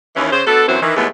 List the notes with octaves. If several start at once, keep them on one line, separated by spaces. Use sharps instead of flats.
D#2 E3 C#4
C#3 C5
B3 D4 F#4 A4
F#2 A#2 E3 F#3 C4 C5
D#3 E3
D#2 A2 E3 G#3 A3 B3